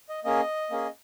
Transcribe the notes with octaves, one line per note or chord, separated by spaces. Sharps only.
D#5
A#3 C#4 G#4 D#5
A#3 C#4 G#4